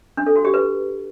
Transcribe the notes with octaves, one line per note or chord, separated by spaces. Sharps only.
D4
A4
F#4
G4
B4